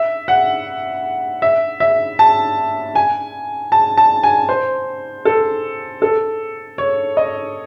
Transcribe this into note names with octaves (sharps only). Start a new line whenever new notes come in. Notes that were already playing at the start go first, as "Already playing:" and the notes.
Already playing: E5
F#5
E5
E5
A5
G#5
A5
A5
G#5
C5
A4
A4
C#5
D#5